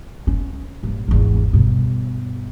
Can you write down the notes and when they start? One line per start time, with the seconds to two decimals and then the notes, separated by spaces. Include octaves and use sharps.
0.27 C#4
0.83 G2 A#2
1.08 G#1 E2
1.53 G2 B2